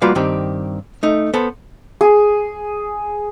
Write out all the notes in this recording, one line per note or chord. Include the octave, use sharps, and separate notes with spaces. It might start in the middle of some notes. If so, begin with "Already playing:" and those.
G3 A#3 F4 F#4 B4 F5
G2 D#3 C4 G4
A3 D#4
B3 A4 C5
G#4